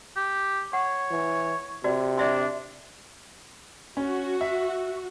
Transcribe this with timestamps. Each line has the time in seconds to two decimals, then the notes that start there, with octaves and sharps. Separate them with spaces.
0.17 G4
0.73 C#5 F#5
1.11 E3
1.84 C3 F#4 D5
2.18 D4 D5 E5 C6
3.97 C#4 F#4
4.41 E5